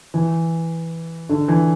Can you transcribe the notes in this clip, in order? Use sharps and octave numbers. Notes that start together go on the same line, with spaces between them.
E3
D3
E3